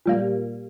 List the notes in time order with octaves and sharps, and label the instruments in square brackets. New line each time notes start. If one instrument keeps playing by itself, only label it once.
[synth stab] A#2 G3 A#3